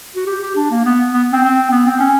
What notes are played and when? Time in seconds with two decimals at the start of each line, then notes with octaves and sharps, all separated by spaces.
0.16 F#4
0.26 G4
0.41 G4
0.55 D4
0.70 A#3
0.85 B3
1.13 B3
1.33 C4
1.43 C4
1.71 B3
1.86 C4
2.00 C#4